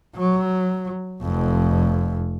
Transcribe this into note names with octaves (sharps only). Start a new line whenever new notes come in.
F#3
F1 F2